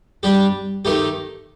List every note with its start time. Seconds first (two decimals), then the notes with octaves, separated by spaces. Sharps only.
0.23 G3 D4 G4
0.85 D#3 A3 D#4 G4